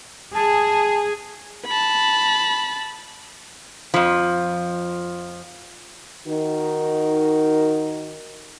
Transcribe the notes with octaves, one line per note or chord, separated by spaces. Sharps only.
G#4 A5
A5 B5
F2 F3
D#3 D#4 F#4 A#4